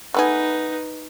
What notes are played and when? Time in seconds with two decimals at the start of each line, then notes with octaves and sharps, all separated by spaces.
0.14 A3 B3 D#4 G#4 B4